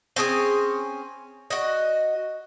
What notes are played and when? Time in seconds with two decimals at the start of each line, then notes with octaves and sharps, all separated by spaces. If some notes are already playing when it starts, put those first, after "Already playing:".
0.16 C4 C#4 G#4 G#5
1.50 F#4 D#5